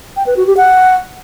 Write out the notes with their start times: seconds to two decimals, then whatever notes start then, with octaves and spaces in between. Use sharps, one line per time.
0.16 G5
0.27 B4
0.37 F#4
0.47 G4
0.57 F#5